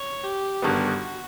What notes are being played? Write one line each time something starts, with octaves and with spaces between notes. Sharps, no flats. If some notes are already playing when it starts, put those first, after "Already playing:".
Already playing: C#5
G4
G1 G2 D#3 G3 B3 F#4